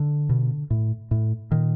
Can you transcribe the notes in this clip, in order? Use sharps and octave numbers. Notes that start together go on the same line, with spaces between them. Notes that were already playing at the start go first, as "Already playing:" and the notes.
Already playing: D3
B2
A2
A2
A#2 D#3